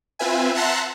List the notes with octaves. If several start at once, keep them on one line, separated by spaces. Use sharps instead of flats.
C4 F4 B4 E5 G#5
E5 F#5 A5 A#5 C6 F#6